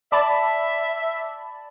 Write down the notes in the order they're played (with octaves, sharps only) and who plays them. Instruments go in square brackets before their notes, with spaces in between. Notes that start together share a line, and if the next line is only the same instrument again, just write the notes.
[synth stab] D5 A5 B5 [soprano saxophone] E5